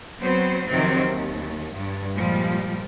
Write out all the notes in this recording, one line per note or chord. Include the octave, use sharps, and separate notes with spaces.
F#3 B3 C4 C5
F2 C3 D#3 F#3 C4
D#2
G2
A#2 F3 G3 G#3